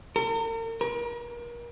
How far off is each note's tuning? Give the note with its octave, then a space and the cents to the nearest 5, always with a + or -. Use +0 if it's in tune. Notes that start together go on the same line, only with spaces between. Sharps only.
A#4 -40
A#4 +40